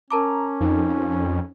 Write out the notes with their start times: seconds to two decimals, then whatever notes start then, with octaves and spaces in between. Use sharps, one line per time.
0.11 C#4 A#4 A5 A#5 D6
0.60 F2 D#4